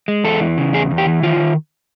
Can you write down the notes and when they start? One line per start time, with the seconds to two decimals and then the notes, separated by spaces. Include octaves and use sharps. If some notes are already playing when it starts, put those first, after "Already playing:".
0.08 G#3
0.24 E2 A4
0.41 E3
0.58 C#3
0.73 E2 G#4
0.91 E2
0.98 G4
1.07 E3
1.23 D#3 F4
1.40 D#3